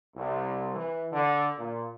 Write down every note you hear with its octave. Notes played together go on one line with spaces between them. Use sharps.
C2
E3
D3
A#2